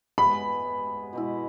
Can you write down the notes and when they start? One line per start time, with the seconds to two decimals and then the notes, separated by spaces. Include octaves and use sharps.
0.18 G#3 B3 G#4 B5
1.13 B2 G#3 E4